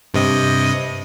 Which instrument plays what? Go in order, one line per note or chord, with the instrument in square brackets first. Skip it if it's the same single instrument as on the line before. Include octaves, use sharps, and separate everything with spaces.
[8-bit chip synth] G2 C3 D#5